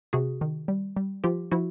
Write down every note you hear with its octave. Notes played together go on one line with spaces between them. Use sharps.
C3 F#4 G#4
D#3
G3
G3
F3 F4 G4
F3 E4 F#4